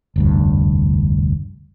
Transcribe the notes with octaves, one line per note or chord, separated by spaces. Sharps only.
F1 D2 G2